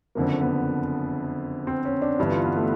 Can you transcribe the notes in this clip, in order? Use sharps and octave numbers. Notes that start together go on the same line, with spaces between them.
F#1 F2 D3 A#3
B3
C4
C#4
D4
G1 G2 E3
F4
B3
A3